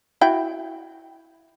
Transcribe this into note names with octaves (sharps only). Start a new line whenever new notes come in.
E4 F#4 G5